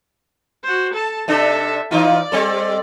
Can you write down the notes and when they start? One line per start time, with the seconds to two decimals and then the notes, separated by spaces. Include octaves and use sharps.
0.64 F#4 C5
0.94 A4 A5
1.28 C3 D4 A4 E5
1.91 E3 D#4 F4 D5
2.32 G3 C4 A4